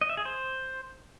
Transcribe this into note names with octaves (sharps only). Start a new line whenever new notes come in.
D#5
E5
G#4
C5